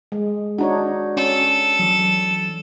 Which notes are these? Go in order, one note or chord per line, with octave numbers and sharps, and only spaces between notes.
G#3
D4 D#4 F#4 C#5 F#5
C#4 A4
E3 F#3